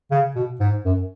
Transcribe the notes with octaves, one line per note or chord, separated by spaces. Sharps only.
C#3
B2
G#2
F#2